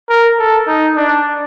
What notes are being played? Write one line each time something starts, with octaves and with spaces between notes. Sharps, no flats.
A#4
A4
D#4
D4